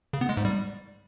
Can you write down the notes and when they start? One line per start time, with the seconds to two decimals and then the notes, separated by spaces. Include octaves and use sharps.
0.13 C#3
0.21 B3
0.29 G#3
0.37 G#2
0.45 G3